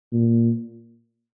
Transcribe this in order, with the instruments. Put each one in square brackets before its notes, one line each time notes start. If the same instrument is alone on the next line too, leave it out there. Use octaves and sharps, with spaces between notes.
[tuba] A#2